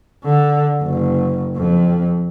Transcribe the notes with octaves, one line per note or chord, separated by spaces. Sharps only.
D3
F#1
F2